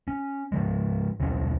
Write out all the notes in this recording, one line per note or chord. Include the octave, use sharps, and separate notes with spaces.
C#4
G#2 F3 G#3
D#1 B1 E3 C#4